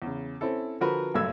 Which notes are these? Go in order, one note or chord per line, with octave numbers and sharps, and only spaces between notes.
E2 C#3
C4 C#4 E4 A4
D3 F3 F#4 A#4 B4
F#1 B1 G2 A3 E6 G#6